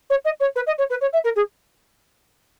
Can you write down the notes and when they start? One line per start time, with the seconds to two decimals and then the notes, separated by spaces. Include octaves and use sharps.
0.10 C#5
0.25 D#5
0.40 C#5
0.55 B4
0.66 D#5
0.78 C#5
0.90 B4
1.01 C#5
1.13 E5
1.24 A#4
1.36 G#4